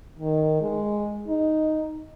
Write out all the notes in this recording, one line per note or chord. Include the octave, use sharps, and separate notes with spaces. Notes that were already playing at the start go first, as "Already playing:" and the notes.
D#3
G#3
D#4